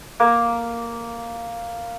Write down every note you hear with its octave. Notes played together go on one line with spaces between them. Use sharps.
A#3 A#4